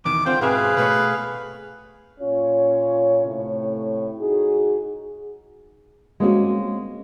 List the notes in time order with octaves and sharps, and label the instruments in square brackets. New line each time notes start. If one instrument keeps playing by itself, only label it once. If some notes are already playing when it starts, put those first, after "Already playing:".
[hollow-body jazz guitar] E2 B2 D#3 [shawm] D6
[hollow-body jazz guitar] C#2 C4 C5 [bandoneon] D3 F4 [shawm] G5
[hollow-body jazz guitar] G#2 B2 E5 [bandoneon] G#4 F5 [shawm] B4
[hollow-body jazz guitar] B2 A3 C#5 [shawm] B4
[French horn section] A#2 C#4 F4 C#5
A2 C3 A3 E4 C#5
D#4 F#4 G#4
[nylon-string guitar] G#3 A#3 C4 C#4 E4 F#4